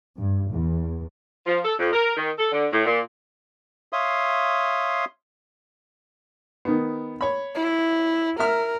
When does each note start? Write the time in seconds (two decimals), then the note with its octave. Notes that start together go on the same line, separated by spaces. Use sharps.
0.18 G2
0.51 E2
1.46 F3
1.65 A4
1.79 F2
1.93 A#4
2.16 D#3
2.38 A4
2.51 D3
2.73 A2
2.86 A#2
3.93 C#5 E5 F5 C6 D#6
6.65 D#3 B3
7.21 C#5 B5
7.55 E4
8.40 A#4 E5 F6